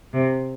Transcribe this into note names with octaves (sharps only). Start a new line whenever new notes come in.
C3